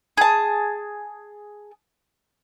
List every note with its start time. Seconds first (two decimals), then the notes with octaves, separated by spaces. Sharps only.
0.17 G#4 A5